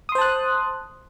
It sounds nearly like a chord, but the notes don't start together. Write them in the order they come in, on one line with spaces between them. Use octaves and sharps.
D#6 C6 C5 A5 F#6